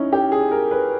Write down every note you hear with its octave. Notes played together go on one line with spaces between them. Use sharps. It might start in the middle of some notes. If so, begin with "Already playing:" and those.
Already playing: C#4 D#4 E4
G4
G#4
A#4
B4